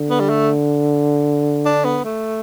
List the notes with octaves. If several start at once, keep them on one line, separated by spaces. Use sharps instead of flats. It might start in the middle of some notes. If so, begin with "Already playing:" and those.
Already playing: D3
B3
G3
A3
D4
B3
A3